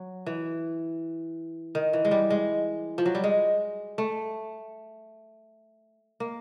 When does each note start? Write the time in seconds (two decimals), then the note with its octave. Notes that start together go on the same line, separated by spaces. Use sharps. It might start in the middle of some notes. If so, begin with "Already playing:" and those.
Already playing: F#3
0.26 E3
1.75 D#3
1.93 E3
2.05 G#3
2.11 G3
2.30 G#3
2.98 F3
3.06 F#3
3.15 G3
3.24 G#3
3.98 A3
6.20 A#3